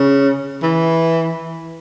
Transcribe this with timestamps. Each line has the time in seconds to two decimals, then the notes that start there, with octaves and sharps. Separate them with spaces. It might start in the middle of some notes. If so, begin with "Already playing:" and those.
Already playing: C#3
0.63 E3